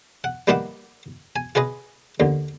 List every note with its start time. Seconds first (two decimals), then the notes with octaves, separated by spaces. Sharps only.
0.24 F#5
0.47 G3 A#3 D#4 B4 E5 F#5
1.36 G#5
1.55 F4 G#4 B4 D#5
2.20 D#2 D3